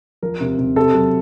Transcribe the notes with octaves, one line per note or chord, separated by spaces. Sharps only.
F3 A#4
C3
C3
C3 A4
F#3